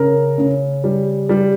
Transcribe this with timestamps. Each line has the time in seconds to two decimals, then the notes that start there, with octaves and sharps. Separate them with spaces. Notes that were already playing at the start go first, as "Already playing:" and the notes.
Already playing: C#3 A#4
0.38 C#3
0.84 G3
1.29 G3